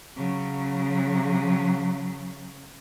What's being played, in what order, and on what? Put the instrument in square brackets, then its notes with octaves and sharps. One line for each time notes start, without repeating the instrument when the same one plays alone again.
[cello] C#3 F#3